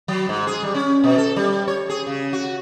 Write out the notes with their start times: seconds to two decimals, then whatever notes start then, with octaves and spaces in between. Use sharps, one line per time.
0.08 F#3
0.29 G#2
0.47 G#4
0.63 G3
0.74 C#4
1.04 B2
1.18 A4
1.36 G3
1.68 C#5
1.89 G#4
2.07 C#3
2.33 F#4